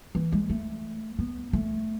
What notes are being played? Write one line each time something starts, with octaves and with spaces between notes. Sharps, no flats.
E3
G#3
A3
B3
A3